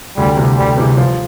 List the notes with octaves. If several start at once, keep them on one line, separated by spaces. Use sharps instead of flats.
D2 G3
C3 E3 G3
D2 G3
C3 E3 G3
F3